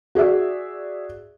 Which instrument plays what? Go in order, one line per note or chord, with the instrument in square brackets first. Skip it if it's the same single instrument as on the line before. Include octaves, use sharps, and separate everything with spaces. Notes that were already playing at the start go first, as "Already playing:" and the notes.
[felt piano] F#4 G#4 D5 E5